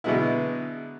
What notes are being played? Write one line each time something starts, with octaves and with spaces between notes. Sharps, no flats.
B2 D3 F#3 G#3 B3 E4